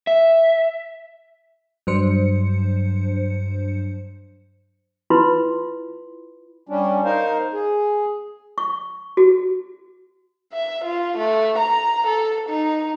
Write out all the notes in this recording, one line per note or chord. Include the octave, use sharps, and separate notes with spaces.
E5
G2 F#3 D4 C5 C#7
E4 F4 B4 B5 C6
G3 C#4 D4
D#4 A#4 C5 F5
G#4
C#6
F#4
E5
F4
A3
A#5
A4
D#4